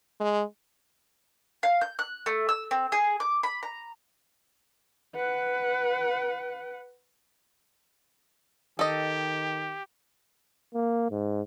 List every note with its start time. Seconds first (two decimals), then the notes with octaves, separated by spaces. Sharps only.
0.20 G#3
1.63 F5
1.81 G6
1.99 F#6
2.26 A3
2.49 E6
2.71 C4
2.92 G#4
3.20 D6
3.43 B5
3.63 A#5
5.15 B4 F#5
8.79 D#3 G4 A4 D#5
10.75 A#3
11.11 G#2